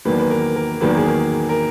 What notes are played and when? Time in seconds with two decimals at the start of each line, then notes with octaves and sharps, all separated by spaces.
0.05 E2 D#3 F#3 A#3 B4
0.20 B4
0.30 A#4
0.56 A#4
0.81 E2 D#3 F#3 A#3 B4
0.89 A#4
0.97 G#4
1.06 A#4
1.49 A#4